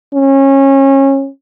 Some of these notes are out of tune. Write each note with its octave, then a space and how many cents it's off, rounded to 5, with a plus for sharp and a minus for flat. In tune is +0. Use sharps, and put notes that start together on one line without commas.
C#4 -25